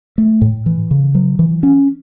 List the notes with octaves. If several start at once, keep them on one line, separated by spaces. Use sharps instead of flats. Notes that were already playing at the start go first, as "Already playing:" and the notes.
A3
A2
E3
C#3
F#3
E3
C#4